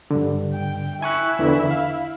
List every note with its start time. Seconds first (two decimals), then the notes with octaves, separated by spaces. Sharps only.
0.11 G2 D3
0.54 G5
1.02 E4 G#5 C#6 F#6
1.39 E2 D3 E3
1.71 F5